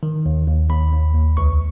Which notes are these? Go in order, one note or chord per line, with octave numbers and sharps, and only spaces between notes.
D#3
D#2
D#2
D#2 B5
D#2
D#2
C#2 C#6